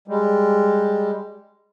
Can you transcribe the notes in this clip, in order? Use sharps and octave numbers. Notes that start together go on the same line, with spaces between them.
G3 G#3